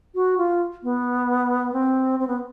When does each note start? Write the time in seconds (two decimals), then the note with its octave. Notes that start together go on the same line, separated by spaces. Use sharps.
0.15 F#4
0.38 F4
0.83 B3
1.73 C4
2.19 C4
2.27 B3